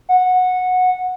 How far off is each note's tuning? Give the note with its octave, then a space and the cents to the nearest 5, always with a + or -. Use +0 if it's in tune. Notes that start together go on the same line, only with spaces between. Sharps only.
F#5 -15